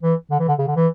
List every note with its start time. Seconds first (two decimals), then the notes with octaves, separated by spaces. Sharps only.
0.03 E3
0.31 D3
0.40 E3
0.48 D3
0.58 C#3
0.67 D3
0.76 E3